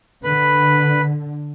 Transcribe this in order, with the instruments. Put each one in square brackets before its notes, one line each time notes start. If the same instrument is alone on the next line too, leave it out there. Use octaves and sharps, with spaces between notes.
[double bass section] D3 [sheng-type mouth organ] B4 B5